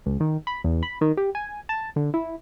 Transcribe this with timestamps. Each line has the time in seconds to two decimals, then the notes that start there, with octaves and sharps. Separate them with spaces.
0.06 C#2
0.20 D#3
0.47 B5
0.64 E2
0.83 B5
1.01 D#3
1.17 G4
1.35 G#5
1.69 A5
1.96 D3
2.14 E4